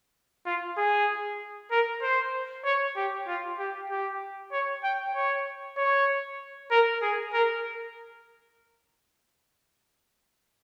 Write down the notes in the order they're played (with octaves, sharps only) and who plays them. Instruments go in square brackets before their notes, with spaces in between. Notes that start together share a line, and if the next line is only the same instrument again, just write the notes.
[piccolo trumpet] F4
G#4
A#4
C5
C#5
G4
F4
G4
G4
C#5
G5
C#5
C#5
A#4
G#4
A#4